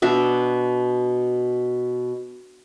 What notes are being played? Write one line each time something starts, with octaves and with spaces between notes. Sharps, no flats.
B2 D4 E5